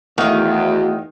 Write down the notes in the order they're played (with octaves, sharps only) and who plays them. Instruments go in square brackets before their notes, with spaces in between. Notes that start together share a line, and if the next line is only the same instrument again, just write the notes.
[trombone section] E2 [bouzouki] D#3 [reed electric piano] A3 E5 F5 [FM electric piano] F#4